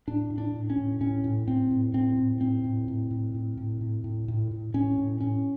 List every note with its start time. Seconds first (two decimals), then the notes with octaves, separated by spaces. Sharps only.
0.07 A2 D4
0.30 A2
0.38 D4
0.54 A2
0.70 C#4
0.78 A2
1.01 A2 C#4
1.24 A2
1.47 A2 C4
1.71 A2
1.94 A2 C4
2.17 A2
2.41 A2 C4
2.64 A2
2.88 A2
3.11 A2
3.34 A2
3.57 A2
3.81 A2
4.04 A2
4.28 A2
4.51 A2
4.74 A2 C#4
4.98 A2
5.20 A2 C#4